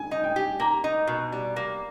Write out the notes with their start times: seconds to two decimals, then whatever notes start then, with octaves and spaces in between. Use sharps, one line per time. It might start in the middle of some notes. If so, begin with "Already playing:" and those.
Already playing: G#5
0.11 D#4
0.24 G5
0.36 G4
0.60 A#3 A#5
0.84 D#4
1.07 B2
1.32 G3
1.56 A#3